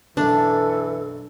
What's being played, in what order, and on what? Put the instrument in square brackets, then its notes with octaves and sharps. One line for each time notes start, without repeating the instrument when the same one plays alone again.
[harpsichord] B1 F#2 D6 [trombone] E3 [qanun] D4 [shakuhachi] A4